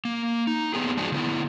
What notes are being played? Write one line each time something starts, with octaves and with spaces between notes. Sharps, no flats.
A#3
D#4
A#3 B3 G4 G#4
F3 G#3 D4 D#4 F#4 G#4
D3 B3 E4